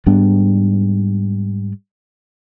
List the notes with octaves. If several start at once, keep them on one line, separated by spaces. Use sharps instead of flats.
G#2 G3 B3 D4